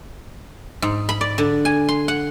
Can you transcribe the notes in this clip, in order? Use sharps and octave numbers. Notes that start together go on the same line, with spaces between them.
G#2
B5
D5
D3
G#5
C6
F#5